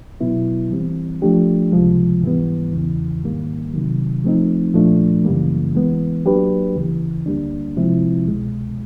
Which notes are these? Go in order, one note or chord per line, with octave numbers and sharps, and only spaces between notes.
B2 F#3 B3 E4
E3 G3 C4
F3 A3 D4 G4
C#2 C3 F3 G#3
G#2 E3 G3 B3
E2 C#3 E3
G#2 D#3 G3 A#3
C3 D#3 F#3
F3 A3 C4 D#4
A#2 F3 A3 D4
F#2 C#3 E3 G3 A#3
E3 G#3 B3
F#3 A#3 D4 G4 B4
D2 C#3 E3
D2 D3 G3 A#3 D4
C3 F3 G#3 C4 E4
C2 B2 G#3